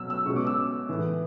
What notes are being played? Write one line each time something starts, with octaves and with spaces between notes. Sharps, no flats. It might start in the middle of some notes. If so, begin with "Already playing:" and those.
Already playing: B2 F#3 C#4 E6
E6
B2 G#3 C#4 C#6
D6
E6
A2 E3 B3